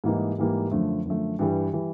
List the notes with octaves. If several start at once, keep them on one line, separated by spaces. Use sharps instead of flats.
G#2 E3 G3 A#3 D#4
G#2 E3 G3 A#3 D#4
F#2 D3 F3 A3
F#2 D3 F3 A3
G2 E3 G3
E3 G3